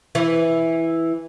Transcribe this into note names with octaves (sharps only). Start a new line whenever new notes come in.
E3